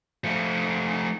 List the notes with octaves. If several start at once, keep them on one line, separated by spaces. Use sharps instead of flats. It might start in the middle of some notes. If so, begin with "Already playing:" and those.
F3 A3